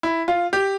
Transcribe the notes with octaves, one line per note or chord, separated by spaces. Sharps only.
E4
F4
G4